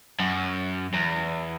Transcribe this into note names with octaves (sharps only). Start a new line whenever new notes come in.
F#2
E2